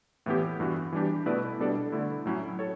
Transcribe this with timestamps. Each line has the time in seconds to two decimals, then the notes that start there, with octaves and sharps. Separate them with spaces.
0.26 A2 E3 B3 E4 G4
0.60 G2 E3 B3 F#4
0.92 E3 G3 D4 G4
1.26 B2 A3 E4 B4 D5
1.59 B2 G3 D4 A4 D5
1.92 D3 A3 E4
2.26 A2 F#3 C#4 E4
2.59 A4 C#5